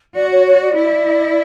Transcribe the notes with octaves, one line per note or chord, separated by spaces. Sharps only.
F#4 D5
C#5
C#5
D5
E4